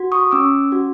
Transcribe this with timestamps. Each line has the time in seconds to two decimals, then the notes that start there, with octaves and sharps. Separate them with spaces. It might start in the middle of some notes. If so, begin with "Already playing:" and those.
Already playing: F#4
0.12 C#6 D#6
0.31 C#4 D6 E6
0.72 F#4